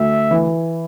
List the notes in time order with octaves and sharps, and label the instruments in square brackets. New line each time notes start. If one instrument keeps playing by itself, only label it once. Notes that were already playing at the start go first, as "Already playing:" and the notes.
Already playing: [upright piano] D2 [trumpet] E5
[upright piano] E3